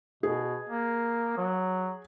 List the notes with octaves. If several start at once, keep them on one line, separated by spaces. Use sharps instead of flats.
B2 G#4
A#3
F#3